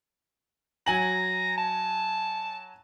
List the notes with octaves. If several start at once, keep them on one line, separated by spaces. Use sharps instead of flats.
F#3 G#5 A#5 F#7
A5